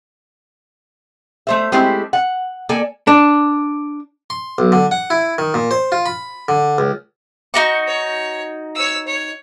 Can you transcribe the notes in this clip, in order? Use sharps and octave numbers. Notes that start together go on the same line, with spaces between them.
A3 C5 E5
G#3 A3 C4 E4 G4 C5
F#5
A#3 A4 D5 G#5
D4
C6
B1
D3
F#5
E4
D#3
A#2
C5
F4
B5
D3
C#2
D#4 F#4 C#6
C#5
C#5 E6
C#5